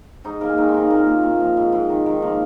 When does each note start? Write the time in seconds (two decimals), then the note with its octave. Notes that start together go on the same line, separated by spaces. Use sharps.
0.24 G#2 D#4 D#5
0.41 G#2 A#3 A#4
0.49 G#3 G#4
0.57 G#2 D#3 D#4
0.69 C4
0.74 D#3
0.80 A#3
0.90 A#2 A#3
1.07 A#2
1.23 A#2
1.40 F3
1.57 G#2
1.72 G#2
1.89 D#3
2.06 D#3
2.22 F3 A#3